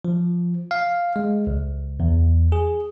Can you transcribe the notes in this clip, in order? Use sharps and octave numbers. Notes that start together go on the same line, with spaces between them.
F3
F5
G#3
C#2
E2
G#4